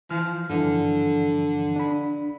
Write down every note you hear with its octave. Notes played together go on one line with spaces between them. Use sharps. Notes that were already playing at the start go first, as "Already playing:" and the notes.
E3 F3 F6
G2 D3 E3 F3
D4 B5